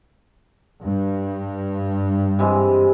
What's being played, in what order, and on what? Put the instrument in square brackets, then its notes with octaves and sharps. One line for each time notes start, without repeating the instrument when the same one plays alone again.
[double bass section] G2
[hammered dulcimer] C3 E3 G#3